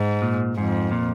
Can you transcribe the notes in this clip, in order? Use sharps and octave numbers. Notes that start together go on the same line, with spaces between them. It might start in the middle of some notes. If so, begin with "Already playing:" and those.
Already playing: G#2
A#2
F2 G#2
A#2